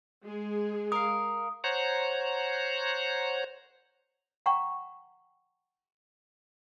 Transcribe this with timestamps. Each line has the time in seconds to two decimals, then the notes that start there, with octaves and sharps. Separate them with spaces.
0.23 G#3 G#4
0.92 A#4 F5 D#6
1.64 C5 C#5 F#5 A#5
4.46 F#5 G5 A#5 C#6